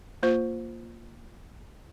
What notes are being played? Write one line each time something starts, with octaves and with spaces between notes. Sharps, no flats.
A#3 F4 C5